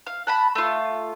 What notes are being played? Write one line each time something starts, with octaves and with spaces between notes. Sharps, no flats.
F5
F#5 A5 B5
A3 F4